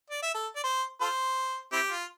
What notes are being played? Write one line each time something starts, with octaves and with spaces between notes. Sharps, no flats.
D5
E5
A4
D5
C5
F4 A4 C5
C4 E4 G4
F4